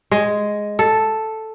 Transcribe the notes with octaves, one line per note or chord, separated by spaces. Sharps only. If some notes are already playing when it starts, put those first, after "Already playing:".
G#3
A4